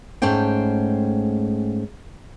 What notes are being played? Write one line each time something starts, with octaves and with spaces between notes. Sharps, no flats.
G#2 A3 C#4 C5 G5